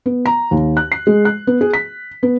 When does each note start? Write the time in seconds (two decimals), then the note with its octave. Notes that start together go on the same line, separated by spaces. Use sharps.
0.06 B3
0.26 A#5
0.51 D#2
0.77 F#6
0.92 C7
1.07 G#3
1.25 F#6
1.47 B3
1.61 G#4
1.74 B6
2.23 B3